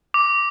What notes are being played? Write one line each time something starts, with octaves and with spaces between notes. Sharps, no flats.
D6